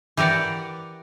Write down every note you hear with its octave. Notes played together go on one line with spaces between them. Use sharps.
E3 G4 A#4 D5 F#5